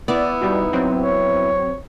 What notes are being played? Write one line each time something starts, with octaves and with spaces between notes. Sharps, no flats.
B3 E4 D5
B2 G3 D#4
F#3 C4
C#5